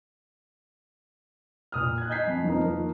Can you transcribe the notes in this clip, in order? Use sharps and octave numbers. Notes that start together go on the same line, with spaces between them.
A#2 D#6 F6
F#6 G#6
D#5 G#5 G6 G#6 B6 C7
F2
F3 D#4 A#4
D#3 F3 A#3